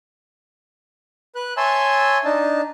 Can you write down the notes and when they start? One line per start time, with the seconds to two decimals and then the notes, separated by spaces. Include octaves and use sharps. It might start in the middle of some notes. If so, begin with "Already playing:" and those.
1.35 B4 F#6
1.57 C#5 E5 G#5 A5 C6 E6
2.25 D4 D#4 A5